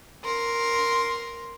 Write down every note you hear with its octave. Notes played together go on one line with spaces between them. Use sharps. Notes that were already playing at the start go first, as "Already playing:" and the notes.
A#4 C6